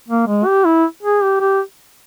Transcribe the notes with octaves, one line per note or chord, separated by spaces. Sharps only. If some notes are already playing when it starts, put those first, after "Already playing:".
A#3
G#3
G4
E4
G#4
G4
G4